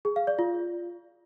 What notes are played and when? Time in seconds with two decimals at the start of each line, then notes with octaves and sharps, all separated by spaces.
0.05 G#4
0.16 F5
0.27 D5
0.39 F4